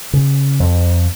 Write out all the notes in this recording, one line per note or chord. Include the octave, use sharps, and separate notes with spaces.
C#3
F2